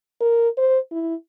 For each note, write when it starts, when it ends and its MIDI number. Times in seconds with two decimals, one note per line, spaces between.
0.21 0.49 70
0.58 0.79 72
0.91 1.14 64